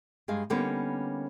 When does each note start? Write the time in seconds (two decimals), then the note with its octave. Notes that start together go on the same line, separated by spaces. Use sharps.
0.28 G2 G#3 D#5 F5 G#5
0.50 D3 G3 A#3 B3 C#4 D#4